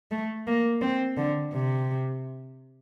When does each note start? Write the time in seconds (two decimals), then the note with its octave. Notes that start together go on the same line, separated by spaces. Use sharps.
0.11 A3
0.47 A#3
0.82 C4
1.17 D3
1.53 C3